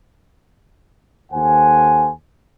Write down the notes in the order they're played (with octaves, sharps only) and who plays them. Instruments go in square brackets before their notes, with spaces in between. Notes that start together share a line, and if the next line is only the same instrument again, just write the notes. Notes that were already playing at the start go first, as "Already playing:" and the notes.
[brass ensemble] D#2 A4 C5 F#5 G#5